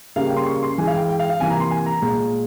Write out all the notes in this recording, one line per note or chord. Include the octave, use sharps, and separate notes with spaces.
C#3 G3 A#3 F5
G5
C6
C#6
C6
E3 G#3 G#5
F5
G5
G5
F5
F5
C3 E3 A#3 G#5
A#5
C6
G#5
A#5
A#2 G#3